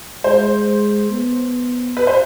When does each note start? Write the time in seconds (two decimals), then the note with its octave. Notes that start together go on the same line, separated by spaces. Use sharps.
0.24 G#3 C5
1.10 B3
1.97 B4
2.07 C5